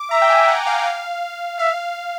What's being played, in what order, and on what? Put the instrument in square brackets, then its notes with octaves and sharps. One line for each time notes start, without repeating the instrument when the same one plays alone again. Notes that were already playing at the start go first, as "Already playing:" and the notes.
Already playing: [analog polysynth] D6
[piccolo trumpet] E5 [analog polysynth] A#5
[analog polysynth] G5
G#5
F#5
F5
F5
[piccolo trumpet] E5 [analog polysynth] F5